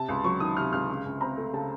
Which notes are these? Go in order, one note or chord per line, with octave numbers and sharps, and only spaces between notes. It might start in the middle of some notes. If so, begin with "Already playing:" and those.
Already playing: C3 A5
C#2
F#3 C#6
D#3 D#6
C3 F6
C#2 F6
C#3
C#2
C4 A#5
A3
C#3 A5